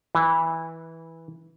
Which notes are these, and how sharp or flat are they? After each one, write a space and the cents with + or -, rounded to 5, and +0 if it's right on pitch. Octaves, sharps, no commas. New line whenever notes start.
E3 -15